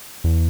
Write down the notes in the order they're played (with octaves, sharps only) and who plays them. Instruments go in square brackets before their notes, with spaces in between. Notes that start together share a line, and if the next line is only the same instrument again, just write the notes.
[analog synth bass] E2